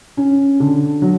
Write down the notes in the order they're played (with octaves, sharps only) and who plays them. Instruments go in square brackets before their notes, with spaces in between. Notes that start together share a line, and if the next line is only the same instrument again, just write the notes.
[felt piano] C#4
D3
F#3